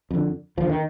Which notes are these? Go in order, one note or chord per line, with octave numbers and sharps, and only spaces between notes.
F2 D3
D#2 D3 F3
D#3